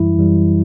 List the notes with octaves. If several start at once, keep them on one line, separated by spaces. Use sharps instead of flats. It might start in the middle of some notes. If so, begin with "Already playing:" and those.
Already playing: F#2 E3 G3 E4
F#2 E3 G3